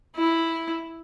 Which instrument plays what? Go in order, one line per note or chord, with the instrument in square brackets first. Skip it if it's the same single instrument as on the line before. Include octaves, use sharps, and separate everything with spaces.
[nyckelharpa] E4